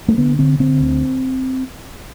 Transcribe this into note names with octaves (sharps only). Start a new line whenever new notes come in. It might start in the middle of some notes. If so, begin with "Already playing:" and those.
A3
D3 B3
D3 C4
D3 C4
D2